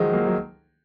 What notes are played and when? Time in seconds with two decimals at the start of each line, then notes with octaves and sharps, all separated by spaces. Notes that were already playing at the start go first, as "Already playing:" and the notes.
Already playing: D#3 F3 F#3 G#3
0.13 F#3 A#3
0.27 F#3